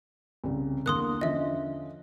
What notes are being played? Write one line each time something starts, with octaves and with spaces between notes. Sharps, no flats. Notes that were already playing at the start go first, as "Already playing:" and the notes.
C2 C#3
E2 D3 A#3 C6 D#6 F#6
D3 F3 C#4 D#5 E5